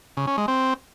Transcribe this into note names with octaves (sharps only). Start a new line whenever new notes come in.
C#3
C#4
G#3
C4